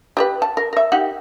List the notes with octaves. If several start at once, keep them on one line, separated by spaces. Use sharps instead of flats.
G4 A4 B4
A5
A#4
A#4 E5
D#4 G4 F#5